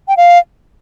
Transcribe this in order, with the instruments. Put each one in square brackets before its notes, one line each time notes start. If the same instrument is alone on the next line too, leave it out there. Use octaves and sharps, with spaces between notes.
[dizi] G5
F5